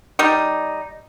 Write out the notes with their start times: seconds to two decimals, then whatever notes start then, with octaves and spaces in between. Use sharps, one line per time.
0.19 G3 D#4